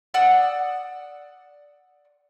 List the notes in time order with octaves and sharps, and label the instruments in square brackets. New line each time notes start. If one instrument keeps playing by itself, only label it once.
[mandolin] D5 F#5 D#6 E6